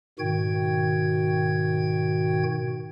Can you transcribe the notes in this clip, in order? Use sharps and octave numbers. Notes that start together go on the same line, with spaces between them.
G#2 B2 D#3 F#4 G5 G#6